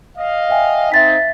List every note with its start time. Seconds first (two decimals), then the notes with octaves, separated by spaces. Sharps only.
0.18 D#5 F5
0.50 E5 G5 G#5
0.92 C4 D#4 E5 A6 B6